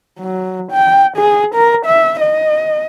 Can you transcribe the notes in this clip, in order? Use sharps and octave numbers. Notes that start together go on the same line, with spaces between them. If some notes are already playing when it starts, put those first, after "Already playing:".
F#3
G5
G#4
A#4
E5
D#5